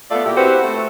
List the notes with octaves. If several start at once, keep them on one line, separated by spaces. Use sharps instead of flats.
A3 B3 F4 A4 D5 E5
A#2 A#3 E4 G4
C4 E4 F#4 G4 B4 C5
A3